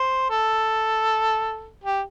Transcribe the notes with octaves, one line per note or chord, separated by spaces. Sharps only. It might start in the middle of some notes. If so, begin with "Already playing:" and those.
Already playing: C5
A4
G4